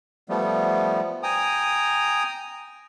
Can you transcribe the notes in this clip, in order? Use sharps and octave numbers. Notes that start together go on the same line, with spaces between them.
F3 G3 A3 B3
G5 G#5 A#5 D#6